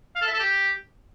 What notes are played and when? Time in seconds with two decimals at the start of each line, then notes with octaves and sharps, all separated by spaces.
0.16 F5
0.22 A4
0.28 E5
0.34 A4
0.40 G4